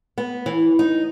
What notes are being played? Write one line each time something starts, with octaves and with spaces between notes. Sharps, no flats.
B3
E3
D#4